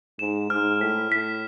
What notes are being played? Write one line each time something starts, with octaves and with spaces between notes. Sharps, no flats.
G#2 E7
G#2 F6
A2 B6
A2 B6